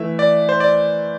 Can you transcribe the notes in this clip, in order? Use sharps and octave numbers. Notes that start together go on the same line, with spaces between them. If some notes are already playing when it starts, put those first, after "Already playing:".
Already playing: E3 A3 E4 E5
D5
C5
D5